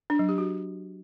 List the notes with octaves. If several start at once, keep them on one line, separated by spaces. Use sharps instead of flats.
D4
F#3
G4
F#4